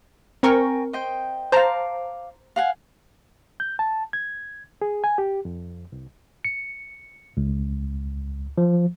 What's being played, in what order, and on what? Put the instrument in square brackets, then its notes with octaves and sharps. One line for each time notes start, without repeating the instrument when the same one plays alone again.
[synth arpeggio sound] C4 A#4 C#6 [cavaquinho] G5 G#5 A#5
[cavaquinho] C5 D#5 G5
[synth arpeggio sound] C5 A5 A#5 [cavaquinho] F5 D6
[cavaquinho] F5 F#5 G#5
[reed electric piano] G6
A5
G#6
G#4
G#5
G4
F2
C2
[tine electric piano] C#7
C#2
F3